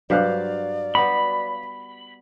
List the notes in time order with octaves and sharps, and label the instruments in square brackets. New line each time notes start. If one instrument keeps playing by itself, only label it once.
[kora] G2 G4 C5 [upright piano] F#3 F5 F#6 [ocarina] D5
[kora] G3 B3 F#4 [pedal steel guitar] B5